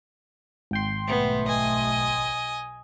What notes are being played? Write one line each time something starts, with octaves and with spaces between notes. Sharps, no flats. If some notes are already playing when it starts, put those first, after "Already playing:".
G#1 G5 C6
B1 A3 B3
D#5 G#5